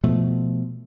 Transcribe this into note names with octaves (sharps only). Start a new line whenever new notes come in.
B2 F3 A3